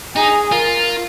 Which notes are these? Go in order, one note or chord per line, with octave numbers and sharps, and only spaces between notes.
D#4 G#4
F4 A#4